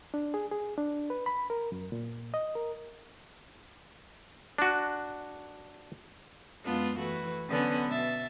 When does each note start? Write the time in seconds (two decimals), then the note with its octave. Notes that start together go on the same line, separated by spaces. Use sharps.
0.14 D4
0.34 G#4
0.52 G#4
0.77 D4
1.10 B4
1.26 B5
1.50 A#4
1.72 F#2
1.92 A#2
2.34 D#5
2.55 A#4
4.58 D4 F#4
6.63 F#2 G#3 B3 D4 F4
6.97 E3 A3 F#4 B4
7.49 D3 F#3 B3 C#4 B4
7.88 B2 E5 A6